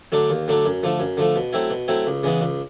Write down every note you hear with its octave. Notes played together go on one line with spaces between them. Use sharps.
D3 F#3 A3 D4
D#2
D3 F#3 A3 D4
F#2
D3 F3 A3
F#2
D3 F3 A3
B2
F#3 A3 C4 E4
B2
F#3 A3 C4 E4
C#2
C#3 E3 G#3 B3
C#2